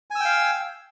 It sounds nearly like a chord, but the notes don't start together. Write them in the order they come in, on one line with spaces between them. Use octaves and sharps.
G#5 E6 G5 F5